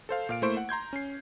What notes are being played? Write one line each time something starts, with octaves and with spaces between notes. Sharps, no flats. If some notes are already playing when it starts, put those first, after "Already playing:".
A4 C5 F5
A#2 F5 D7
A3 A#3 E4 C5 C#6 D7
F#5
A#5 C6 G6 G#6
C#4 C7